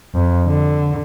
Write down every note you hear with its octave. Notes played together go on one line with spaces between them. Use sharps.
F2
D3